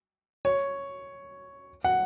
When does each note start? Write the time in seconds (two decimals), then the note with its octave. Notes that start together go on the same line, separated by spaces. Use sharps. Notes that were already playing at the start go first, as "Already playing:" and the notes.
0.45 C#5
1.84 F#5